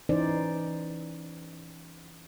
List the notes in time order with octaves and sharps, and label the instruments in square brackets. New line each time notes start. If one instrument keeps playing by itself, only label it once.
[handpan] E3 C#4 D#4 C5 D5